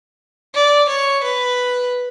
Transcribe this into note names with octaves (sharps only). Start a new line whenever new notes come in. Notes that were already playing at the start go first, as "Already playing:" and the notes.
D5
C#5
B4